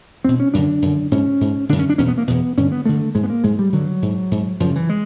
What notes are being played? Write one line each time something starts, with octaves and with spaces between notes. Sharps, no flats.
E2 B2 C4
C#4
F#2 D3 D4
F#2 D3
G#2 C#4
G#2
F#2 D3 D4
C#4
D4
E2 B2 C#4
B3
A#3
E2 B2 B3
G2 D3 C#4
B3
G2 D3 A3
G#2 G#3
B3
A#3
G#2 G#3
G3
G2 D3 F#3
G#2
G#2
F#2 C#3 F3
E3
G#3